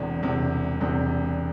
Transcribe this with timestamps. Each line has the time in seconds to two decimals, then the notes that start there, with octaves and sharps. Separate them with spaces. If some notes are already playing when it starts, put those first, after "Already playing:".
Already playing: E1 E2 C3
0.23 E1 E2 C3
0.80 E1 E2 C3